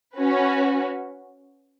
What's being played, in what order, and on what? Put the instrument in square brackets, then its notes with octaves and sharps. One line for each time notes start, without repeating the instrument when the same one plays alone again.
[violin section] C#4 F#4 B4